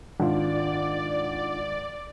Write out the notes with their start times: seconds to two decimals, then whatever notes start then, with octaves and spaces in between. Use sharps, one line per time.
0.20 G#1 D4 F4 D5